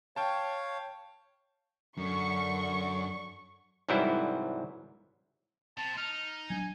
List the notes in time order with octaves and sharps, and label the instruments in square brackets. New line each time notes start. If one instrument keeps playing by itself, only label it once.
[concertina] C#5 F5 [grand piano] G5 A5
[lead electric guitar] F#2 [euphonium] D3 [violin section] C#6
[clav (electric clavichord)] C2 G#2 E3 F#3 G3 E4
[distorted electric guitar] C3 [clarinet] A5
[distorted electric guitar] D#4 [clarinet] F6
[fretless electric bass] F#3 C4 D4 [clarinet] G#5